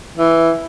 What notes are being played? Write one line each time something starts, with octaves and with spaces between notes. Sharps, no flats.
E3